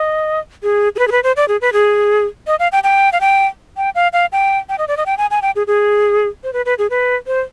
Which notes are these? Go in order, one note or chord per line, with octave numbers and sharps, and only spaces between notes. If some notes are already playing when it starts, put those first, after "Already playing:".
Already playing: D#5
G#4
G#4
B4
G#4
B4
C5
D5
G#4
B4
G#4
D#5
F5
G5
G5
F5
G5
G5
F5
F5
G5
G5
D#5
D5
D#5
G5
G#5
G#5
G5
G#4
G#4
C5
B4
B4
G#4
B4
C5